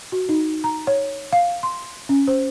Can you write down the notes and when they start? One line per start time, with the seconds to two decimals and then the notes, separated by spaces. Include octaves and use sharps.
0.12 F#4
0.29 D#4
0.64 A#5
0.87 C#5
1.33 F5
1.63 C6
2.09 C#4
2.28 C5